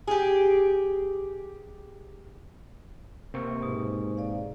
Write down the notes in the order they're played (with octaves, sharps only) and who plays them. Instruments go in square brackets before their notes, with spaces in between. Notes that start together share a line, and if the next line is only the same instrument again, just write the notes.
[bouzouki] G4 G#4
[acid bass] C3 [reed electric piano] A#3 C4 C#6
[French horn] G#2 [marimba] B2
[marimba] D5 F5